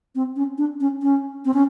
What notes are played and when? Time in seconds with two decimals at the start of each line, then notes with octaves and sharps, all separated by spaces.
0.15 C4
0.36 C#4
0.58 D4
0.80 C#4
1.02 C#4
1.45 C4
1.54 C#4